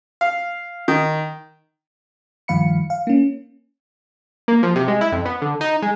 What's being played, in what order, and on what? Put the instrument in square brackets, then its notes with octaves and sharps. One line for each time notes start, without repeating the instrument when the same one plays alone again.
[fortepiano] F5
D#3
[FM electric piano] G2 D#3 F3 F5 B5 C#7
F5
A#3 C#4
[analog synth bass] A#3
F3
C3
G#3
E4
F2
B3
D3
D#4
G#3